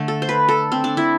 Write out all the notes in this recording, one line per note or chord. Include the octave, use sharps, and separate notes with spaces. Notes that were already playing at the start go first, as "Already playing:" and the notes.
Already playing: D3 A3
A4
C5
B4
A4
C4
D4
E4